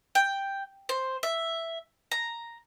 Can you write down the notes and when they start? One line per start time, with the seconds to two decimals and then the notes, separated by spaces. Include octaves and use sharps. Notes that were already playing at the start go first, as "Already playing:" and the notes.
0.15 G5
0.89 C5
1.23 E5
2.11 A#5